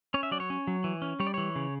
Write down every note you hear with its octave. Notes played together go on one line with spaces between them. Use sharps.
C#4 C#5
E5
F#3 D5
C#5
C#4
F#3
E3
C#4
G3 C#5
D5
E3 C#5
C#3